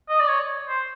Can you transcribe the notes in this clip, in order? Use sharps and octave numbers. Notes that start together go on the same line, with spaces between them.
D#5
D5
C#5
C5